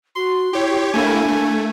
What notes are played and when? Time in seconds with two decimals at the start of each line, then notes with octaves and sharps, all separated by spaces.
0.16 F#4 C6
0.53 E4 G4 C#5
0.94 A3 A#3 D4 E4 G#5
1.28 A3